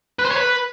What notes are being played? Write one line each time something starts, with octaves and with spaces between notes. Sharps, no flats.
B4
C5
C#5
B4